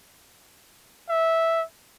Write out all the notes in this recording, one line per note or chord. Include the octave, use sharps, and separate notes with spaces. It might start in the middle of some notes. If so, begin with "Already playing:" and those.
E5